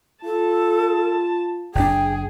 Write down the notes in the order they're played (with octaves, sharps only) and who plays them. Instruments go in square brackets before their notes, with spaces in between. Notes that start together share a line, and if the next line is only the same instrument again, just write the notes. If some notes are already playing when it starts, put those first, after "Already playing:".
[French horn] F4 [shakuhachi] A4 [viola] A5
[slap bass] F#1 C#3 D4 [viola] G#4 [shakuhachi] G5